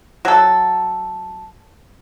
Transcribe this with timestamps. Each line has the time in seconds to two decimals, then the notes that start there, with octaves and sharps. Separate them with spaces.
0.25 F#3 A4